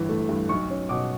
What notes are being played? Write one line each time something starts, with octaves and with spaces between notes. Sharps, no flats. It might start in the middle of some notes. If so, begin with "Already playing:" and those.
Already playing: G1 E3
A3
G2
B1 C#6
C#4
B2 D6